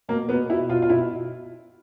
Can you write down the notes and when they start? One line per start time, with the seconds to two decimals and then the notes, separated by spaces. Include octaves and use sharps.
0.09 B2 A#3
0.29 B2 B3
0.50 B2 E4
0.69 B2 F4
0.82 F4
0.90 B2 E4